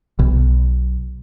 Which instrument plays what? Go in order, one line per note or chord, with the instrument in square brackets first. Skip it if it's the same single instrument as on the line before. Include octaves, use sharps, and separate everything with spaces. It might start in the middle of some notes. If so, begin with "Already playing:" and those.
[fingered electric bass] B1